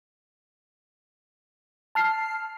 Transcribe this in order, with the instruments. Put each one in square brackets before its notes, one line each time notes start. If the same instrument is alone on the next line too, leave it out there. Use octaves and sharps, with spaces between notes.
[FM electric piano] A5 F6 C7